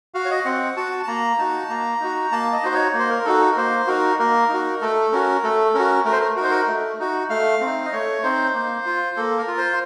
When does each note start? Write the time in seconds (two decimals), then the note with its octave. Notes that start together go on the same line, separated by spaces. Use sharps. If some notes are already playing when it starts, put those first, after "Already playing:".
0.14 F#4 F5
0.25 C#5
0.31 D#5
0.45 C4 F#5
0.77 F#4 A5
1.03 A5
1.08 A#3 A#5
1.38 D#4 F#4 A5
1.69 A#3 A#5
2.01 D#4 F#4
2.32 A#3 A5
2.53 D#5
2.63 D#4 F#4 C5
2.74 C#5
2.94 A#3 C5
3.10 A#4
3.25 D#4 F#4 A4
3.52 A#4
3.57 A#3 C5
3.87 D#4 F#4 A#4
4.19 A#3 A#4
4.49 D#4 F#4
4.81 A3 A4
5.12 C#4 F#4 A#4
5.43 A3 A4
5.74 C#4 F#4 A#4
6.05 A3 A#4
6.12 C5
6.20 A#4
6.36 F#4 A#4
6.40 D#4 C5
6.51 A#4
6.67 A3
6.99 D#4 F#4
7.29 A3 F5
7.61 C4 D#4
7.85 D#5
7.92 A3 C#5
8.23 C4 D#4 C5
8.54 A#3
8.86 F4
9.17 A#3 A4
9.38 A#4
9.48 F4
9.58 C5